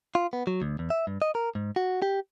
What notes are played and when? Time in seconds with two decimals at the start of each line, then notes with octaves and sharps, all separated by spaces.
0.15 F4
0.33 B3
0.47 F#3
0.62 D2
0.79 E2
0.90 E5
1.07 G2
1.22 D#5
1.35 A#4
1.55 G#2
1.76 F#4
2.02 G4